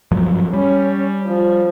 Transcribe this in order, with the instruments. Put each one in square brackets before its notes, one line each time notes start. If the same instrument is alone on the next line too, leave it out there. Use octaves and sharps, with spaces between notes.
[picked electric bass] G2 F3 F#3
[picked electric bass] G3 [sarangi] C#4
[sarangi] F3